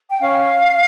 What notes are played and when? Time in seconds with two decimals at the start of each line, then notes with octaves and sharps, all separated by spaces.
0.09 G5
0.19 C#4 F5